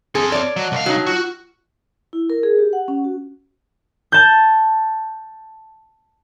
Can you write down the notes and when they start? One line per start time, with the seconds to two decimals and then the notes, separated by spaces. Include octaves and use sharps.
0.15 C4 G#4 A4
0.32 C#5 D5
0.56 F#3 D#5 F#5 A5
0.72 C2 D#5 F5
0.86 F#3 D#4 G5 A5 A#5
1.06 F4 F#4
2.13 E4
2.30 A#4
2.43 G#4
2.59 G4
2.73 F#5
2.88 C#4
3.04 F#4
4.12 A5 G6